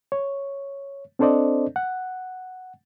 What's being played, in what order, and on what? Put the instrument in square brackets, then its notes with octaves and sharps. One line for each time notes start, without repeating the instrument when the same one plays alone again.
[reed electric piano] C#5
C4 D4 A4 C5 D5 D#5
F#5